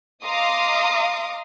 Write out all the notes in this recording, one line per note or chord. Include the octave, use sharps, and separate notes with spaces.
D#5 F5 A#5 C6 D6 D#6